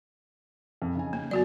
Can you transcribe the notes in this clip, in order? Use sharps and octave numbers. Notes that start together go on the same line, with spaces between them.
F2
C#3 D#4 G#5
A#3
F#2 B3 F#4 D5